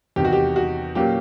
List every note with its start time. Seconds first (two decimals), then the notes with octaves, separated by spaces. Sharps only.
0.16 E2 C3 D#3 G4
0.24 F#4
0.33 G4
0.56 F#4
0.95 A#2 F#3 A#3 C#4 G4